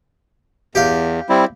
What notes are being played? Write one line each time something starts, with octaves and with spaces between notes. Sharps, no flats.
E2 G4 F5
G3 C4 E4